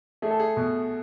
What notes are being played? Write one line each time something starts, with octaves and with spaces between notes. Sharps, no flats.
A3 G#4
A4
G#4
B2